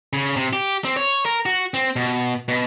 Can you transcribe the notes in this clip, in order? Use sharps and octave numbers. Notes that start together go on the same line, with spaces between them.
C#3
C3
G4
C4
C#5
A#4
F#4
C4
B2
B2